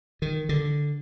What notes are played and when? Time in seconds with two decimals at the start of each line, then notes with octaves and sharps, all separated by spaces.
0.22 D#3
0.49 D3